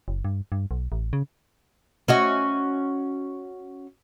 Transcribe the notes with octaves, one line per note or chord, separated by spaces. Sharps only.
F#1
G2
G2
B1
A1
C#3
C#4 F#4 D#5